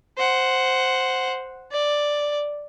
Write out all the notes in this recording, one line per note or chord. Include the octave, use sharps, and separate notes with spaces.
C5 F#5
D5